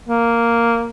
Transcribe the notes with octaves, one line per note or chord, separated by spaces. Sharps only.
A#3